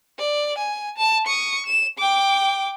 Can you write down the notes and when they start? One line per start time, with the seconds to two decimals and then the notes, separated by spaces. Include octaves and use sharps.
0.19 D5
0.58 G#5
0.97 A5
1.26 C#6 D#6
1.66 E7
1.99 G5 D6